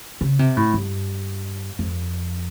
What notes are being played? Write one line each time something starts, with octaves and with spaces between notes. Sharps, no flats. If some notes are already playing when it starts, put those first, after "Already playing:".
C#3
C3
A2
G2
F2